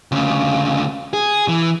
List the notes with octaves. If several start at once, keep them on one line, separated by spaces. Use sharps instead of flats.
D2 C#3
G#4
E3